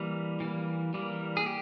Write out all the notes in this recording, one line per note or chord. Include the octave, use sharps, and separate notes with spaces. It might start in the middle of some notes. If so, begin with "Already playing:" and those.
Already playing: E3 G3 A#3
E3 G3 A#3
E3 G3 A#3
G#4
G4